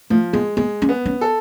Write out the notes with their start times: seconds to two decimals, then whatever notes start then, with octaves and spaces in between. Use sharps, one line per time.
0.10 F3 A3
0.33 G#3 B3
0.57 G#3 B3
0.82 C#4
0.89 B3
1.06 C#4
1.21 A4